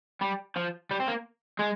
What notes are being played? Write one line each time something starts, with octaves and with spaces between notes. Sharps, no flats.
G3
F3
G3
C4
A#3
G#3